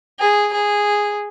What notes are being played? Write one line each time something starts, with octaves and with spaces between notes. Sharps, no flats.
G#4
G#4